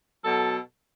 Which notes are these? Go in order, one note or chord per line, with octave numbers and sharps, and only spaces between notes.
B2 F#3 A4